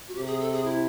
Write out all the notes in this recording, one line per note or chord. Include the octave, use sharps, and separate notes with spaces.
F#4
C3 G4
A4
G#4
A4
G#4
E4